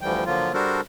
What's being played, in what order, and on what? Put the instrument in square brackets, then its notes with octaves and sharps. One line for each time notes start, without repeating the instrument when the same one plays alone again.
[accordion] D2 D3 E3 F3 G3 G5
D3 F3 F#3 A#3 F4
G3 D4 F#4 A4 A#4 C5